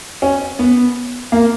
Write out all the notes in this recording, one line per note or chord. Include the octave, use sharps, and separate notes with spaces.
C#4
B3
A#3